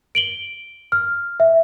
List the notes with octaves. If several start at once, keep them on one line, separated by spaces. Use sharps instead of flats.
D7 F#7 G7
F6
E5